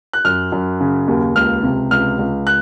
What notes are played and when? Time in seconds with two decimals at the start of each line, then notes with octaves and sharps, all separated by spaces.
0.13 F#6
0.25 F#2 F6
0.52 F#2
0.80 C#3
1.08 D#2
1.35 C#2 F6
1.63 C3
1.91 C#2 F6
2.19 C#2
2.47 F#6